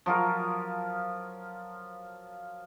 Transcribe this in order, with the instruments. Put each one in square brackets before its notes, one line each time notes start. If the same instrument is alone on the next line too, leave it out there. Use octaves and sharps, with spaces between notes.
[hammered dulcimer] F3 F#3 F4 A#4